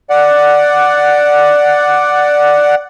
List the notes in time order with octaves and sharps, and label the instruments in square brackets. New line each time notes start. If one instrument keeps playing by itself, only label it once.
[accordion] D5 F#5